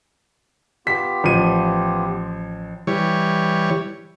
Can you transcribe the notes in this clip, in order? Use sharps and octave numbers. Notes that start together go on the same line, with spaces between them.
B3 F4 G4 B6
A1 F3 D#7
E3 G3 C#5